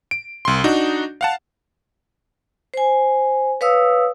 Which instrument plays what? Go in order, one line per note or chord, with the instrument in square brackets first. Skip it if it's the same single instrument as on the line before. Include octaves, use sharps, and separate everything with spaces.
[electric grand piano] D7
C2 C6
D4 D#4 F#4
F5 F#5 A5
[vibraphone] C5 G#5
B4 C#5 F5 D#6 E6